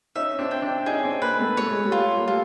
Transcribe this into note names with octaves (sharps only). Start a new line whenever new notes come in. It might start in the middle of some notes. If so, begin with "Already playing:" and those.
C#4 D#4 E5
C4 D4
G5
C4 D4
C#4 D#4 G#4
C4 D4
A#3 C4 B4
A3 B3
A3 C#5
G#3
G3 A3
F4
A#3
G3 A3 F4